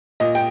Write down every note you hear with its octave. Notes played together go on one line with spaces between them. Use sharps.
A#2 D#5
G5